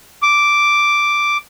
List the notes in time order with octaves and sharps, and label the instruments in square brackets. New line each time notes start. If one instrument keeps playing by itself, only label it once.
[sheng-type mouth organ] D6